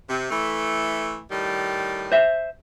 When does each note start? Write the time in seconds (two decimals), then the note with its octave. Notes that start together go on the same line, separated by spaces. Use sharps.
0.09 C3
0.30 E3 A3
1.30 A2 D#3 G3
2.12 C5 E5